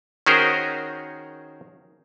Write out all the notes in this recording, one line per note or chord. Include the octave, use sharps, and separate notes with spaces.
D#3 C#4 F#4 G#4 A#4 C5